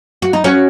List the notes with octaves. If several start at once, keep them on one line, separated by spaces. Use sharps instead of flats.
F#4
D#4
C#4 F#4